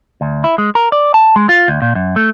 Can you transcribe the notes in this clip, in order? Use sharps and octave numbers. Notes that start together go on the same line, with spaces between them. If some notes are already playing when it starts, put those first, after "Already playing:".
D2
E4
G#3
A#4
D5
A5
G#3
F4
D2
A#2
F#2
A3